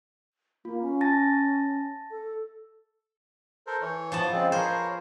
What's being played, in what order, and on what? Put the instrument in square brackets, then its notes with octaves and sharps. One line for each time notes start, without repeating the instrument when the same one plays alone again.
[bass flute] A#3 [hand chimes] F4
[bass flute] C#4
[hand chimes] A5 A6 A#6
[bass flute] A4
[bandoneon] A4 A#4 C5
E3 C#5
[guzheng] F3 B3 A5
[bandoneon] C#3 G#3 C4
[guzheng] G#4 C5 [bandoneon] A#4 C#5